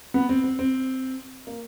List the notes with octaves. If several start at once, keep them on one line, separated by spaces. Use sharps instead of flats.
B3
C4
C4
C4
A#3